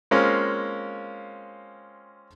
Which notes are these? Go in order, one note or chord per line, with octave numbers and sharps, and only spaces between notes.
G#3 A#3 C4 C#4 F4